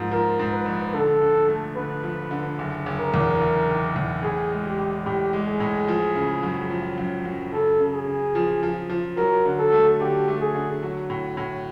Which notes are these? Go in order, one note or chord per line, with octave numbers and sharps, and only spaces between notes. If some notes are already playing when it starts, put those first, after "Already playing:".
Already playing: G#2 F3 A#3
F3 A#4
G#2
B4
A#1
D3 A4
D3
A3
D3 B4
F3
D3
F#1
F#1
A#4
E2
F#1
D#3
E2
A2 G#4
G#3
G4
A2
A2 G4
G#3
G#4
A2
F3
C#3
F#2
F3
F#2
F#2
C#3 A4
C#3
G#4
C#3
F3
F3
F3
F#3 A#4
D3
A4
A3
D3 G4
A3
G#4
D3
F#3
A2
A2